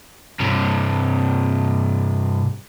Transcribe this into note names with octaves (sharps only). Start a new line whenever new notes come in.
G2 C3